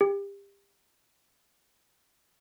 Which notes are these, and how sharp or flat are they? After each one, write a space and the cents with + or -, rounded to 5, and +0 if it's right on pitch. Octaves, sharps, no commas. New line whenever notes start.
G4 +30